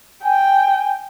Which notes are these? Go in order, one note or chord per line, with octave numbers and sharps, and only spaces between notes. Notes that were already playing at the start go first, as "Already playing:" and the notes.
G5 G#5